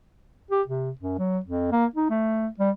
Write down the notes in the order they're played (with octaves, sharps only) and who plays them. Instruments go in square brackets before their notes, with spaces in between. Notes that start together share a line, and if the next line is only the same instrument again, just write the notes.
[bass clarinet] G4
C3
F#2
F#3
F2
A#3
D#4
A3
G3